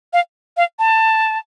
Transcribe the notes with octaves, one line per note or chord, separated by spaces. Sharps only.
F5
F5
A5